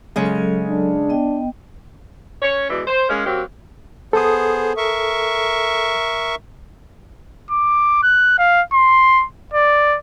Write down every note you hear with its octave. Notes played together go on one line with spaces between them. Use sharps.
C#3 F#3 G#3 C#4 A4
D4
B3 D#5 G5
C#4 C#5
B2 E3 G#3 D5 E5
C5
G#3 A#3 C#4
F#3 A#3 C4 F#4 G4
B3 G#4 A4 C5 D#6
A#4 E5 C#6
D6
F#6
F5
C6
D5